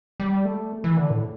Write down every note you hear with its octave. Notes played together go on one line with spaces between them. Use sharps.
G3
A3
E3
D3
A2